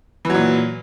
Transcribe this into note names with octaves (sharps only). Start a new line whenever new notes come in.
A#2 E3 F#3